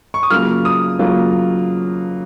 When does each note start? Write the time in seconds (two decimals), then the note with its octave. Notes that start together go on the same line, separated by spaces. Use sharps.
0.14 C#6
0.23 D#6
0.30 C#3 F#3 A#3 F4 F6
0.65 D#6
0.99 C#3 F#3 A#3 F4